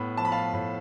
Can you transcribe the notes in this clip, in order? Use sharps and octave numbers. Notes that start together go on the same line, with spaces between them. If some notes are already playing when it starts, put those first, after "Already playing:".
Already playing: A2 B3 B5
F3 A5
B5
F5 A5
A2